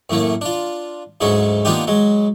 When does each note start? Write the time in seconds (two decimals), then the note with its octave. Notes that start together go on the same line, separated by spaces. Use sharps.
0.10 F#2 A2 A3 A#3
0.41 D4 F4
1.21 D2 G#2 F#3 G#3 C#4
1.65 A#3 B3 D4 D#4 F4 G4
1.87 F#3 G#3